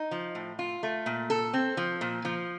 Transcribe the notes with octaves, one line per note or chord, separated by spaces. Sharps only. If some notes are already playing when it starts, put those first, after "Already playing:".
Already playing: D#4
F3
A2
F4
A3
A#2
A4
C4
F3
A#2
F3